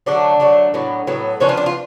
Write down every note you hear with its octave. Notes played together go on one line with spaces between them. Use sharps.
D3 F#3 A3 D4 D5
D3 F#3 A3
A2 F#3 B3
A2 F#3 B3
F3 B3 C#4 D4 C#5
F4
D4
F4